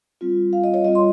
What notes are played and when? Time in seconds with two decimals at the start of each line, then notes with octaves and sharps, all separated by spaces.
0.21 G3 C4 F4
0.53 F5
0.64 D#5
0.74 C#5
0.84 G3 C4 F4 D#5
0.95 C6